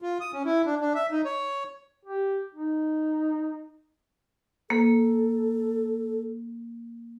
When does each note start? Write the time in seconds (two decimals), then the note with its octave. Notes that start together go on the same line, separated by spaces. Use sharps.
0.02 F4
0.21 D#6
0.33 C#4
0.45 E4
0.66 D4
0.81 D4
0.95 E5
1.11 D#4
1.25 C#5
2.05 G4
2.55 D#4
4.70 A#3 A4